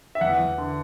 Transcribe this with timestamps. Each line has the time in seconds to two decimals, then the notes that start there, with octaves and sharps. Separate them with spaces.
0.15 E5
0.21 E2 F#5
0.39 E2
0.58 D3